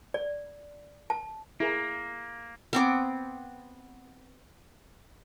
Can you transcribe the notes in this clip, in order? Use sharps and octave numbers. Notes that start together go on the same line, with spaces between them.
D5
A5
A#3 E4 G#4 A#4
B3 C4 D6